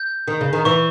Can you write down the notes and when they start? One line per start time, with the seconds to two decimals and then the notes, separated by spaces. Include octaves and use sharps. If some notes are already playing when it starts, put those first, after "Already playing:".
Already playing: G6
0.28 D#3
0.41 C#3
0.53 D#3
0.65 E3 C#6